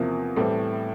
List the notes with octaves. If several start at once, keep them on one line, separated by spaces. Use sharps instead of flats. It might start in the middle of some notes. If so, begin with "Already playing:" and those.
Already playing: E2 C3 F3 A#3
A2 E3 G3 C4 A4